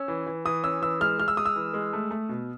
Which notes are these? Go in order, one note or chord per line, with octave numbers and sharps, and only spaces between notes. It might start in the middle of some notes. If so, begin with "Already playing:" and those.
Already playing: C#4 E6
E3
E3
E3 D#6
C#4 E6
E3 E6
G#3 F6
G#3 F6
E6
G#3 D#6
E6
E3
G#3
A3
A3
B2